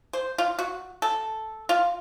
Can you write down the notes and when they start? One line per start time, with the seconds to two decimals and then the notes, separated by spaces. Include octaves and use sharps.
0.13 C5
0.38 F4
0.59 F#4
1.02 A4
1.69 F4